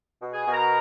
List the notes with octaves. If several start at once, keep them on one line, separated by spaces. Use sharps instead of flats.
B2
G#4 G#5
B2
A#4 A#5